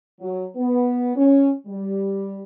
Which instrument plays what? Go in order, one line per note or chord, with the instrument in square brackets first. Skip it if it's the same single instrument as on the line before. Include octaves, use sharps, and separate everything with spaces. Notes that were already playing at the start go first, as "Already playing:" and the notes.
[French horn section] F#3
B3
C#4
G3